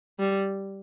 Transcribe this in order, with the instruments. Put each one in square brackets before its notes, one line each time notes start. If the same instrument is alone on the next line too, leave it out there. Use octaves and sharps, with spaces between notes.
[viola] G3